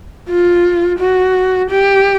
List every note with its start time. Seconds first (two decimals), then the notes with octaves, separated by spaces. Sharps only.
0.29 F4
0.99 F#4
1.70 G4